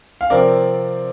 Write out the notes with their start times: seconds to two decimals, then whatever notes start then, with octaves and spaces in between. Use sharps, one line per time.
0.21 F5
0.30 C3 F3 C4 A#4 D5